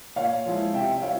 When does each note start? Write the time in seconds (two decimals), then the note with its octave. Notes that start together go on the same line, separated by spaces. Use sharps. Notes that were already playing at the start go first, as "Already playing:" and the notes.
0.16 A#2 C#5 F5
0.45 F3 G#3 E4
0.73 C3 E5 G5
0.91 E5
1.02 G3 C4 E4 C#5 F5